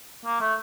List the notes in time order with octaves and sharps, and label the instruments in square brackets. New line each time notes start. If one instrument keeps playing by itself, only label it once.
[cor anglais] A#3
A3